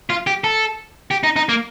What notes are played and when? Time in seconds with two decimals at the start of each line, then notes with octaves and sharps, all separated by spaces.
0.10 F4
0.27 G4
0.44 A4
1.11 G4
1.23 D#4
1.36 D#4
1.49 A#3